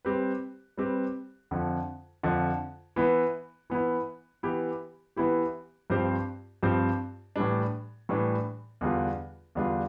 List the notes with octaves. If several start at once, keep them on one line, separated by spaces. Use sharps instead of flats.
G3 C4 G4 B4
G3 C4 G4 B4
F2 D3 F3
F2 D3 F3
E3 B3 E4
E3 B3 E4
E3 B3 E4 G4
E3 B3 E4 G4
G2 F3 C4 G4 C5
G2 F3 C4 G4 C5
A2 E3 G3 D4
A2 E3 G3 D4
E2 D3 G3 D4 F4
E2 D3 G3 D4 F4